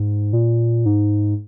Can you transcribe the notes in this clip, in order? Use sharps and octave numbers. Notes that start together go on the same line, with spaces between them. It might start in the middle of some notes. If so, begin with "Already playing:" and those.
Already playing: G#2
A#2
G#2